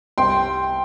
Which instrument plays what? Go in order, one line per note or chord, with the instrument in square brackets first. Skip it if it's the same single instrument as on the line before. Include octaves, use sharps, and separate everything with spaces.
[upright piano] C2 G5 C6